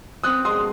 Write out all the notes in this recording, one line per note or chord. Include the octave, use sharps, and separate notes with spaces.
C4 D#6 F#6
G#3 C6 D#6